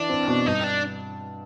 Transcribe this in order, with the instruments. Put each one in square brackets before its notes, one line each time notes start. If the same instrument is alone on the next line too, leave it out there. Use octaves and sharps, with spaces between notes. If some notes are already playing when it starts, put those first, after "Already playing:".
Already playing: [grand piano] E3 [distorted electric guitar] D4
[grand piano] C4
B2
[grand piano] G2 [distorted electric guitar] D#4
[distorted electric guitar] D4